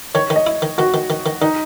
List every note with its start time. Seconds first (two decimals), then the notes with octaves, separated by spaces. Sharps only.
0.15 D#3 C#5
0.30 D#3
0.36 D#5
0.47 E4
0.62 D#3
0.78 D#3 F#4
0.94 D#3
1.10 D#3
1.26 D#3
1.41 D#3 D#4